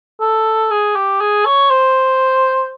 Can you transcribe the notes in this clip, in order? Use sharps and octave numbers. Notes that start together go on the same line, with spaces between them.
A4
G#4
G4
G#4
C#5
C5